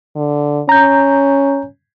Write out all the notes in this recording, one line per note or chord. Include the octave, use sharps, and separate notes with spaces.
D3
C#4 A#5 G6